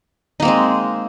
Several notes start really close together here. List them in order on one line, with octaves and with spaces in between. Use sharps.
D#4 A#3 C4 G#3